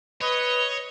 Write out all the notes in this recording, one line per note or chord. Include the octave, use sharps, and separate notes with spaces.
B4 C#5 D#5